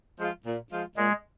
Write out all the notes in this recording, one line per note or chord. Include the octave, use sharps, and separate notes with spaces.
F3 G#3 F4
A#2
F3 G#3 F4
A#2 G#3